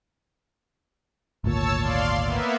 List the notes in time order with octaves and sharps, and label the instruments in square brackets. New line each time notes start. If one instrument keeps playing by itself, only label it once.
[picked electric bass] G#1 D2 A#2 [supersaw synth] C#5 A5 E6
[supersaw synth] D5 F5 C6
A#3 B3 E5